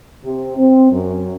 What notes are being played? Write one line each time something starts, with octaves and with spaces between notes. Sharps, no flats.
C3
C4
F#2